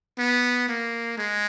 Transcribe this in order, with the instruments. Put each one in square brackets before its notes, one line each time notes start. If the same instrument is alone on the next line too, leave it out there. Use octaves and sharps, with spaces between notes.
[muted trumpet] B3
A#3
G#3